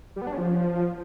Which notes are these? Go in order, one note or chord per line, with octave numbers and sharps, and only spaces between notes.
G3
B3
D4
C#4
F3